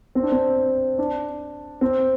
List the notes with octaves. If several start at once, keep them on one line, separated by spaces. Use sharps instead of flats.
C4
D4
C4
D4
C4